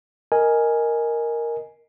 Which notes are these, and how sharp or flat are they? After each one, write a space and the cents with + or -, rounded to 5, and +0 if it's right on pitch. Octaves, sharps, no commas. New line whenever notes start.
A#4 +0 D#5 +0 G#5 +0